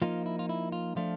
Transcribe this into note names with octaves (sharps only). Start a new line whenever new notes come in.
F3 A#3 D#4 F4
E4
F4
E4
F4
F3 A3 D4 F4